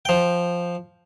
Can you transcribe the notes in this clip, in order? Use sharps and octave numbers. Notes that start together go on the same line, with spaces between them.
F3 G5